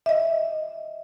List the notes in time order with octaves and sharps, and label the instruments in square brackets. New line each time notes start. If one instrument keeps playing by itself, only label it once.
[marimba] D#5 E5